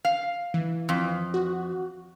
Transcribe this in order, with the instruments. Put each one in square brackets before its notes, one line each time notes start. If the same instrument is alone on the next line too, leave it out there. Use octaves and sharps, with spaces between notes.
[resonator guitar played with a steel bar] F5
[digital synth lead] E3
[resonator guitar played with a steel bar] F2
[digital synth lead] F#4